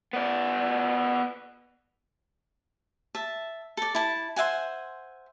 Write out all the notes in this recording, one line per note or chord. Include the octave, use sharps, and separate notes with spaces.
B3 D5
E5 A5
A4 D5
E4 A5
C5 E5 F#5 G#5